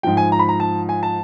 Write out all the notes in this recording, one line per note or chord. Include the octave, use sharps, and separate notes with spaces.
G#2 F3 G5
G#5
A#5
B5
A#5
A5
G#5
A5